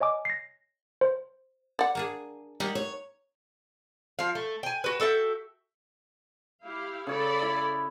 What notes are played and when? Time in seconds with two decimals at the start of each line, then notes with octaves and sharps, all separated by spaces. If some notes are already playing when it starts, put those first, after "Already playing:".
0.01 C#5 D#5 G#5 D6
0.25 A#6 C7
1.01 C5
1.79 D5 F#5
1.95 A#3 D4 G#4
2.60 G3 A#3 D#4 F#5
2.75 C#5
4.19 F3 F5
4.35 A3
4.63 G5 G#5
4.84 F#4 B4
5.00 F#4 A4 E5 G5
6.63 E4 G4 F5
7.07 C#3 A4 C#5 D5 B5
7.42 E4